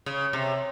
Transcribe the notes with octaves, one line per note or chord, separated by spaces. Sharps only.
C#3
C3